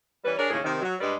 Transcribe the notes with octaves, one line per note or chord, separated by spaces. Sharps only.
E3 G3 C#4 B4
D4 G#4 A#4 C#5
D#2 A2 C#3 G#4
C3 D#3
F#3
G2 G3 G#3 B4 D5